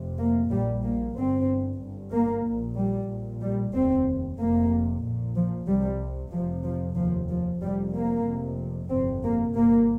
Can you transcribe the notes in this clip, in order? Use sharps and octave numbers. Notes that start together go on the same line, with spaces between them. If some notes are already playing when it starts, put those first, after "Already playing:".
Already playing: F1 F2 C3
A#3
A#1 A#2 G3
A#3
G1 G2 C4
G1 G2
A#3
A#1 A#2
G3
A#1 A#2
G3
F1 D#2 C4
F1 F2 C3 A#3
A#1 A#2
F3
C2 C3 G3
F1 F2 C3 F3
F3
F1 D#2 F3
F3
F1 F2 C3 G3
A#3
F1 F2 C3
G1 F2 C3 C4
A#3
G1 G2 A#3